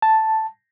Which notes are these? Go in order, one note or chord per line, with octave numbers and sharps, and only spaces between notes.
A5